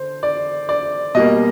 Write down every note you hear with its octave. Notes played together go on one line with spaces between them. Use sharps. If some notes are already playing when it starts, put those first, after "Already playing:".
Already playing: D3 C5
D5
D5
B2 G3 A#3 D#5